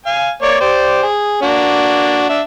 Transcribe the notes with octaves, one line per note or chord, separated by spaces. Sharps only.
F5 G#5
A#3 C#5 D5
G4 C5 D5
G#4
A#3 D4 F#4
D4 E5